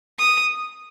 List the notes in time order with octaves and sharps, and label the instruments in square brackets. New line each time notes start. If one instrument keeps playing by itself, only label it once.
[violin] D#6